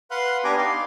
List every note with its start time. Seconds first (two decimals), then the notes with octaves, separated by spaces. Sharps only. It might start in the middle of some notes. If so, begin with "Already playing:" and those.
0.11 B4 F5 F#5 C6 F#6
0.44 B3 D4 G4 G#5 A#5 D6
0.57 D#4 D5 F5 C6